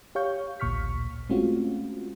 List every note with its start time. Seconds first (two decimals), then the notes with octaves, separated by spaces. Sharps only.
0.15 G4 C#5 F5 C#6 G6
0.60 A1 D2 A#2 C#6 F6 B6
1.29 G#3 A3 C4 C#4 F4 F#4